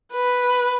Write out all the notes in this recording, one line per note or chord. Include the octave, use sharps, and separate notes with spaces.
B4